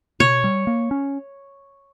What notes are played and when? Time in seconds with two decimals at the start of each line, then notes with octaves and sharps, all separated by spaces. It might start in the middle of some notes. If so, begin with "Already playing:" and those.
0.20 B2 C#5
0.44 G3
0.67 A#3
0.91 C#4